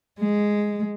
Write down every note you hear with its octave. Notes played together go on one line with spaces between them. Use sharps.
G#3